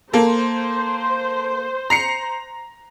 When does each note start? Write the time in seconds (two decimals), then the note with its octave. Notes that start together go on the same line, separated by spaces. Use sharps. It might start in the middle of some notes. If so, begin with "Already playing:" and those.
0.13 A#3 A4 C5
1.90 A#5 C7 C#7